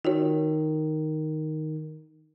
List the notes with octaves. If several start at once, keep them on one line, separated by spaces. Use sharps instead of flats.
D#3 F4 F#4 C#5